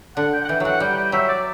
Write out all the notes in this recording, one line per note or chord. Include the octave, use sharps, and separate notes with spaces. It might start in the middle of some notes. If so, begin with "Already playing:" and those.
D3 F#5
G5
F#5
E3 G5
E3 F#3 F#5
G3 G5
G5
F#3 E5
D5